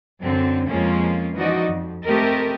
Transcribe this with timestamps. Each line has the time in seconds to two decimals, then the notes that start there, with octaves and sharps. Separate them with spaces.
0.22 F#2 D3 F#3 C4
0.68 F2 G#3 A#3 C#4 F4
1.36 E3 F3 D#4 F#4 D5 D#5
1.69 F2
2.05 A3 C4 G4 A#4 D#5